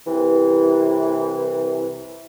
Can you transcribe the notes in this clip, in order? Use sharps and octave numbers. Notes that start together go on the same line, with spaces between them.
C2 C3 E3